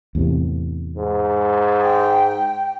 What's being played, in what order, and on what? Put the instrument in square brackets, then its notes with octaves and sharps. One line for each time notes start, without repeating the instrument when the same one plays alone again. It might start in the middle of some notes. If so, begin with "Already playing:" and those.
[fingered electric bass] E2 A2 C3
[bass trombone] G#2
[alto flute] G5